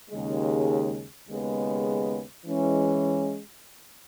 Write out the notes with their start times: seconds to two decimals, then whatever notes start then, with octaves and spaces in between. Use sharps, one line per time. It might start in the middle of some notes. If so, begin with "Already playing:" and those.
0.10 D#2 C#3 G#3
1.28 D#2 C#3 G#3 B3
2.46 E3 G#3 C#4